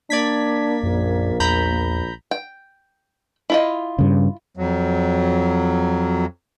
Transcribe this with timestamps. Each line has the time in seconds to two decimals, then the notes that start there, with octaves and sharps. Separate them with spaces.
0.10 A#3 D4 D5 G#6 B6
0.83 A#1 F#2
1.40 E2 A#5 B5 G6
2.31 G5
3.50 E4 F4 D#5
3.99 G2 C#3
4.57 F2 F#3